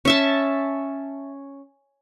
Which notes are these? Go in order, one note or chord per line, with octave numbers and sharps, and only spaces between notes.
C#4 E5 A5